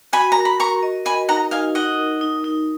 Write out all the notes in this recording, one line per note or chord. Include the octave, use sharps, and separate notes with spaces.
F#4 G#5 B5
A#4 A#5
B5
A#4 A#5 C#6
D#5
D#5 G#5 B5
D#4 F#5 A#5
D#4 F5 G#5
D#4 D#5 F#5
A#4
D#4
D#4